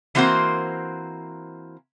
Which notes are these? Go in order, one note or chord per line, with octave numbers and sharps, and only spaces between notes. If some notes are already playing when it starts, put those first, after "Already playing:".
E3 A#3 C4 F#4 A#4 C5